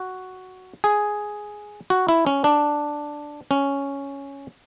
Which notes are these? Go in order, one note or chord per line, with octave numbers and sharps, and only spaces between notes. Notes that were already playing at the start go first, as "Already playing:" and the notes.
Already playing: F#4
G#4
F#4
E4
C#4
D4
C#4